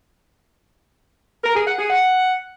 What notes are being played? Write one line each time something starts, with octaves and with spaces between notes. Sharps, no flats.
A#4
G#4
F#5
G#4
F#5